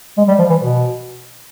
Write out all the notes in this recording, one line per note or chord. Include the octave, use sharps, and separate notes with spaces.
G#3
G3
F3
E3
B2